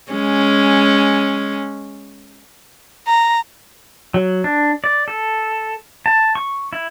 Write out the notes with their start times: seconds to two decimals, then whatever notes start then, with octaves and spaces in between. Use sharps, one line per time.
0.11 G#3 C#4
3.07 A#5
4.14 F#3
4.44 D4
4.84 D5
5.08 A4
6.06 A5
6.35 C#6
6.73 E4